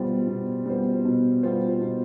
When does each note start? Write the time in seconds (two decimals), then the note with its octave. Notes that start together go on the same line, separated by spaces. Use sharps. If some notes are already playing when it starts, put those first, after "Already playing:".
Already playing: B2 G3 B3 F4 C5
0.28 B2
0.66 G3 B3 F4 C5
1.05 B2
1.43 G3 B3 F4 C5
1.81 B2